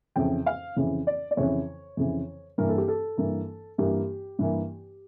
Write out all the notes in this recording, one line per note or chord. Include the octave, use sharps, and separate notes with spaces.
F2 C#3 E3 G5
F5
F2 C#3 E3
D5
D5
F2 C#3 E3 C#5
F2 C#3 E3
G2 E3 A#3 A#4
A4
G4
A4
G2 E3 A#3
G2 E3 A#3 G4
G2 E3 A#3